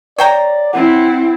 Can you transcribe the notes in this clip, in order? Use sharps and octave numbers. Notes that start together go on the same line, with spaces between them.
C#5 D5 G5 A#5
C4 E4 F#5